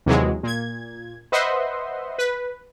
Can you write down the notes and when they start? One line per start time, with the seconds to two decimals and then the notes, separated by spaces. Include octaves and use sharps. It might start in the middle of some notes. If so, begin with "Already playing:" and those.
0.06 D#2 C3 E3 F#3 G#3
0.43 A#2 G#6
1.32 B4 C5 D#5 E5 F#5 C6
2.18 B4